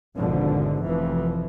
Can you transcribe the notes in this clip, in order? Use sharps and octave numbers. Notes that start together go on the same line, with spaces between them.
G#1 E2 G#2 B2 D3 F3
F1 F2 E3 F3